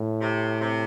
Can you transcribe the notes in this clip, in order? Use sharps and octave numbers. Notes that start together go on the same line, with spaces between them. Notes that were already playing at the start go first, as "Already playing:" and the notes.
Already playing: A2
C3
C3